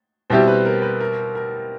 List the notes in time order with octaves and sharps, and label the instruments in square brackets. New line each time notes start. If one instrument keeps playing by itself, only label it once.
[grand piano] B2 G3 C4 E4 G4 [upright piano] C5
[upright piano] B4
A#4
B4
A#4
A#4